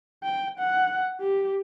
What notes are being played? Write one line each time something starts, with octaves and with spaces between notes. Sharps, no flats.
G5
F#5
G4